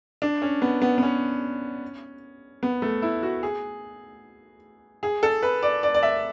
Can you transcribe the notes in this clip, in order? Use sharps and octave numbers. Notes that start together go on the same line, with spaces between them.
D4
C#4
B3
B3
B3
C#4
B3
A3
E4
F#4
G#4
G#4
A4
B4
D5
D5
D5
E5